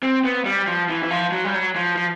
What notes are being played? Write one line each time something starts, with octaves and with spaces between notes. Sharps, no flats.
C4
B3
G3
F3
E3
E3
F3
F#3
G3
F#3
F3
F3